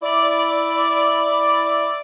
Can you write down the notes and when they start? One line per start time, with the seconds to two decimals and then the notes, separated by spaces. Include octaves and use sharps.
0.03 E4 D5